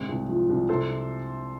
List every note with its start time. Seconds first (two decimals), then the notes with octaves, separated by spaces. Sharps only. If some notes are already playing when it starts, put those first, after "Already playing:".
Already playing: G#1 C3
0.09 C2
0.29 F3
0.49 C2
0.68 C3 A4 C5